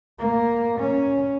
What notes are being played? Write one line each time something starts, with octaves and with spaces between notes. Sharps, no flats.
A#3
C#4